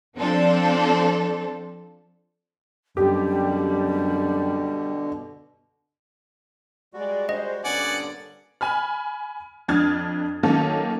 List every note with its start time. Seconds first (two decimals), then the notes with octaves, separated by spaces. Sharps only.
0.17 F3 C4 D4 A4
2.97 F#2 B2 D3 G3 G4
6.93 G3 G#3 F#4 D5
7.29 G#3 C5 D#5
7.65 G2 A#2 D3 B3 C#4 D5 F#5 G#5
8.61 G#5 B5 F6
9.68 F2 D4 D#6 F6 G#6 A6
10.43 D#3 F#3 A#3 C#4 A4